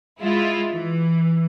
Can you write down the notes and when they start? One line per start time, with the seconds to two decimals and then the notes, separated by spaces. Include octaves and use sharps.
0.20 G#3 E4 F4
0.72 E3